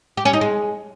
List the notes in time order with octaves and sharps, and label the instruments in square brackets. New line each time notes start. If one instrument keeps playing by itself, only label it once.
[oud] G4
C#4
D#4
G#3